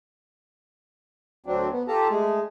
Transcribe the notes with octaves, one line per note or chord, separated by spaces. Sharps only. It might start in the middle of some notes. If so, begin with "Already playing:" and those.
D2 F#3 C4 D4
B3
F4 G4 A4 A5 A#5
G#3 A3 G#4